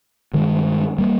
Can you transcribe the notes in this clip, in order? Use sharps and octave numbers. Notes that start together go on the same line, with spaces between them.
G2 D#3 G#3
G3 A#3